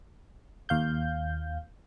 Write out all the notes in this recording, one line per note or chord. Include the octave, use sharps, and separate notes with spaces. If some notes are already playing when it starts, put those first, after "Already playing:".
D#2 F5 G6